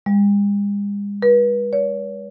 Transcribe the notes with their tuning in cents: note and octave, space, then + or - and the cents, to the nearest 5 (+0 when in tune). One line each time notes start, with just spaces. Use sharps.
G#3 -45
B4 -35
C#5 +40